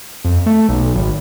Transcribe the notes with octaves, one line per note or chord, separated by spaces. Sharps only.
F2
A3
B1
G#1